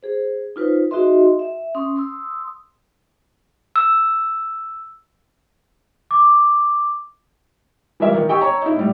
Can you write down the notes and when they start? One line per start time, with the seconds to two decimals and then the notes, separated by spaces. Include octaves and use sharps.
0.03 G#4 C5
0.56 D#4 F4 B4 C5
0.91 D#4 F#4 G#4 D#5 E5 C6
1.39 E5
1.75 C#4 C6 D#6
1.96 C6 D#6 E6
3.76 E6
6.11 D6
8.00 E3 F3 G3 A#4 E5
8.15 D#3
8.29 G4 D#5 G5 G#5 C#6 E6
8.41 C#5 A#5 C#6
8.62 D#4 E4
8.76 A2 G3